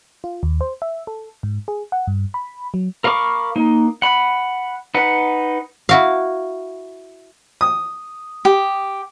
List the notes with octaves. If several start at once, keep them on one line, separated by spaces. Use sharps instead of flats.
F4
D#2
C5
E5
A4
G#2
G#4
F#5
G2
B5
F#3
A#4 F5 B5 C#6 D6
A#3 D#4
F#5 B5
D#4 B4 F#5
E4 F#4 F5
D#6
G4